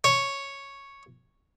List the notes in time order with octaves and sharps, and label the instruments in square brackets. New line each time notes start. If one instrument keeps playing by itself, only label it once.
[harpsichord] C#5